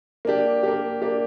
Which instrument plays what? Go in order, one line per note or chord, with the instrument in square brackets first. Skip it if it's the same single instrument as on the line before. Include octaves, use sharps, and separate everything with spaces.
[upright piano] A#3 D4 G4
A#3 D4 G4
A#3 D4 G4